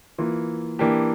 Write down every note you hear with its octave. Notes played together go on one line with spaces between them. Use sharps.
E3 A#3 F4
E3 A#3 D4 G4